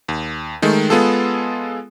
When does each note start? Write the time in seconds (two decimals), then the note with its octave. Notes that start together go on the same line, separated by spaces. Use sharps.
0.09 D#2
0.62 D#3 G#3 A3
0.90 G#3 B3 F4 G#4 A4